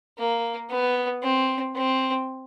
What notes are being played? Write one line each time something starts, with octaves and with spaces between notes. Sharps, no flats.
A#3
B3
C4
C4